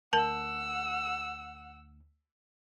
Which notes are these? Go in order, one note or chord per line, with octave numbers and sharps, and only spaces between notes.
D2 A#4 F#5 A5 E6